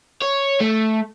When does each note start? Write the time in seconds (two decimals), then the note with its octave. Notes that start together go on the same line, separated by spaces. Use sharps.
0.22 C#5
0.61 A3